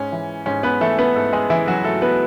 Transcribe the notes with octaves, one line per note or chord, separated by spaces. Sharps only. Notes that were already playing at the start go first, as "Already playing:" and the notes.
Already playing: G#2 C#4
E3
G#2 C#4
B3 B4
E3 A3 A4
B3 B4
G#2 A3 A4
G#3 G#4
E3 E4
F#3 F#4
G#2 A3 A4
B3 B4